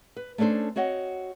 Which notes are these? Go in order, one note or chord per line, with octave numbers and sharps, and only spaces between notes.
B4
A3 C#4 D4 A4 C5
C4 F#4 C#5 D#5 F#5